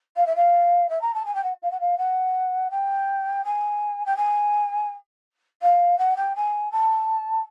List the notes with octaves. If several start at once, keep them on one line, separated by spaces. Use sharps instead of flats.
F5
E5
F5
E5
A#5
A5
G#5
G5
F#5
F5
F#5
F5
F#5
G5
G#5
G5
G#5
F5
F#5
G5
G#5
A5